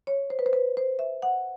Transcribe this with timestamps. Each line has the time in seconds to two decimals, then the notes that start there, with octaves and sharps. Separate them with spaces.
0.07 C#5
0.30 C5
0.39 B4
0.46 C5
0.53 B4
0.77 C5
0.99 E5
1.22 F#5